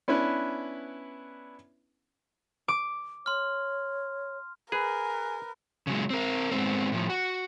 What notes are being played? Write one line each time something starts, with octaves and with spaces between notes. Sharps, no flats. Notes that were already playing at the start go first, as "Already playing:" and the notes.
B3 C#4 D4 E4 B4
D6
C#5 C6 F6
G#4 A#4 B4 G#5
C#3 F#3 G#3
C4 A#4
G#2 G#3 B3 C4
A2 F3
F#4